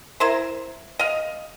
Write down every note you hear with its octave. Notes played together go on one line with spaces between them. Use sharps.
E4 A#4 C5
D#5 F5